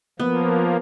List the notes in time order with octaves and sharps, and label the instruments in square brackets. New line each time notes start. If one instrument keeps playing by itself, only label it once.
[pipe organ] F3 A#3 [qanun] B3